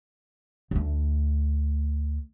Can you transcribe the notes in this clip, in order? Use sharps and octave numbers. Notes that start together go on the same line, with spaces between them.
D2 A3